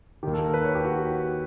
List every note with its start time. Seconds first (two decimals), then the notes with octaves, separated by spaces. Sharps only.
0.23 D#2 D#3 G4
0.34 A4
0.44 A#4
0.54 B4
0.64 C#5
0.75 G4
0.85 F#4
0.95 F#4